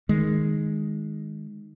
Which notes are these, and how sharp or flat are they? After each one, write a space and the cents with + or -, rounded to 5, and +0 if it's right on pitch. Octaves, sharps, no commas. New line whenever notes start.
D#3 +0 G#3 +0